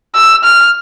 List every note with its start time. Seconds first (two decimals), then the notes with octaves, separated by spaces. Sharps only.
0.15 E6
0.44 F6